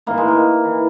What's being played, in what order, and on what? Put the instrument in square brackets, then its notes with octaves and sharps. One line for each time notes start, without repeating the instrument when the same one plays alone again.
[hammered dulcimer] G#2 E3 A#3
G#3
A#3
E3